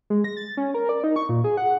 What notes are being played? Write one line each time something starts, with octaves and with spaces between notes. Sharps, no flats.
G#3
A#6
A6
C#4
A#4
D5
D#4
C#6
A#2
G#4
F#5